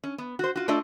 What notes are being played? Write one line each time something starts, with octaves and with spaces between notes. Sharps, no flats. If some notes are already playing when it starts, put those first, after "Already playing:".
C#4
B3
F#4 C5
F4 F#4
A3 D4 F4 A4 D5 D#5